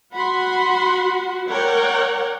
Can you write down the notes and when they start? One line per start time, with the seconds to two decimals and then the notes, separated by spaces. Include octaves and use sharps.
0.12 F#4 F#5 B5 C6
1.48 A#4 C#5 D5 F#5 G5